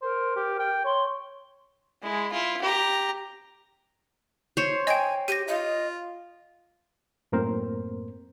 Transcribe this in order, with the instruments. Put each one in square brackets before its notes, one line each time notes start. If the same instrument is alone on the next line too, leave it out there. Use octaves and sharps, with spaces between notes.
[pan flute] A#4 [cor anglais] C5
[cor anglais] G4
G5
[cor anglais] C#5 [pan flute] C6
[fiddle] G#3 E4
E4 F4
G4 A#5
[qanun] C5 C#5
[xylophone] D#5 G5 [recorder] G#5
[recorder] G4 [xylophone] A#6 D#7
[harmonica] F4 [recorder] D#5
[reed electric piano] F#2 A2 A#3 C4 A#4 C5